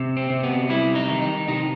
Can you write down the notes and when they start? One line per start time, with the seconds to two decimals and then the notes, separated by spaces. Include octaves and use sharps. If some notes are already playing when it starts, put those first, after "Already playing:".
Already playing: C3
0.17 C4
0.30 C3
0.43 B3
0.69 G3 E4
0.95 D#4
1.08 D#3
1.22 D#4
1.48 C3 D#4